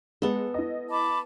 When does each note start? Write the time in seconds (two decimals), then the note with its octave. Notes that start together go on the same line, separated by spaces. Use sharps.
0.22 G#3 B3 A4
0.54 E4 D#5
0.91 A5 B5 D6